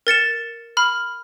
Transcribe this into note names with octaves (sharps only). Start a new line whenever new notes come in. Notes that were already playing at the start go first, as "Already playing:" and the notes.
A#4 A6 C#7 E7
B5 F6